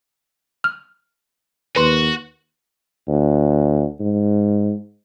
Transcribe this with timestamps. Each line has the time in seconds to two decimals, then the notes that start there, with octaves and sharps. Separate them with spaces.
0.64 F6
1.76 D#2 F#4 B4 C6
3.08 D2
4.00 G#2